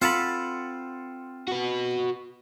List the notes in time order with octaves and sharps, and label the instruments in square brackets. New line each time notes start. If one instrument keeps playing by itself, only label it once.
[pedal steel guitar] C4 F#5 B5 [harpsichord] F4 A4 A5
[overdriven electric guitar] F#4 B4